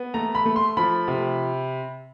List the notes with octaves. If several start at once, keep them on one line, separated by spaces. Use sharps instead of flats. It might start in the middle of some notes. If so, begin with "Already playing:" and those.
Already playing: B3
A3 A#5
B5
A3
C6
F3 B5
C3